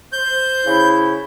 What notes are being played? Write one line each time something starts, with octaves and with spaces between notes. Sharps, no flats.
C5 G6
C#3 E4